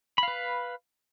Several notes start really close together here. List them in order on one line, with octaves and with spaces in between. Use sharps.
B5 F5 B4